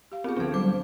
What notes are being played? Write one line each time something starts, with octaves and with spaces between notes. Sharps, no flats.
G4 F5
B3 C4 F4 G#4 A#4
D2 F3 C4 D4 A4
F#3 G3 D6